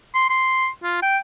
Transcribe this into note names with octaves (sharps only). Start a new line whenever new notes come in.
C6
C6
F4
G5